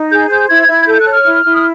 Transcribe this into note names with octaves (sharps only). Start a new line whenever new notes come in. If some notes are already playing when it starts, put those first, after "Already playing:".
Already playing: D#4
G#4 G6
C5 G6
E4 G#6
E4
A4 G6
F#6
C#5
F6
E4
E4
D#6